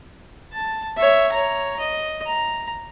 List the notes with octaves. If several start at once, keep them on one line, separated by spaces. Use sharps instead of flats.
A5
C#5 E5
C#5 A#5
D#5
A#5